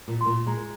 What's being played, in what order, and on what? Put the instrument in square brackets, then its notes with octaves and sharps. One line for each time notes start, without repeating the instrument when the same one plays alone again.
[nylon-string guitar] A#2
[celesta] C6
[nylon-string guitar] A#2
[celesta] C6
[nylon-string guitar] G#3 [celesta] A#5